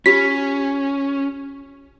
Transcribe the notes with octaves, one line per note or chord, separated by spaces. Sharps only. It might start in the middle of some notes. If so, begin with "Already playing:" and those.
C#4 F4 G4 B6